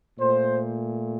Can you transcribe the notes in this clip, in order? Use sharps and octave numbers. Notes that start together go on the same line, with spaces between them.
A#2 A3 C5